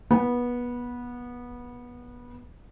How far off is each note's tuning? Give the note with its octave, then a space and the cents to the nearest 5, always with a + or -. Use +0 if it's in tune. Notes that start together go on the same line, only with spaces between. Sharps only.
B3 -20